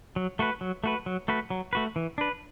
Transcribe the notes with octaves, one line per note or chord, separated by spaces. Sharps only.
F#3
A3 F#4 B4
F#3
A3 F#4 B4
F#3
A3 F#4 B4
F#3
A3 F#4 B4
E3
D4 B4